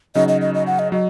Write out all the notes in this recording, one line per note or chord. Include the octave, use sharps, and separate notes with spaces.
C#3 F#3 D#4 F#4 D#5
D#5
D#5
D#5
F#5
D#5
F#3 D#5